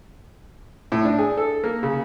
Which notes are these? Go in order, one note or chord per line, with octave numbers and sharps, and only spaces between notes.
A2
D4
G#4
A4
A#3
C#3